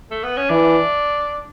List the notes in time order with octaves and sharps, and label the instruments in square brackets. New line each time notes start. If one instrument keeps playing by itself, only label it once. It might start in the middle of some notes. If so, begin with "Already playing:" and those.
[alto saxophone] A3
B3
C#4
[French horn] E3 [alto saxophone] D4